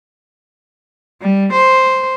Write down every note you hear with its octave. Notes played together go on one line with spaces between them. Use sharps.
G3
C5